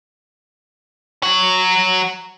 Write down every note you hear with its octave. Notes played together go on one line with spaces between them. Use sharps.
F#3 F#4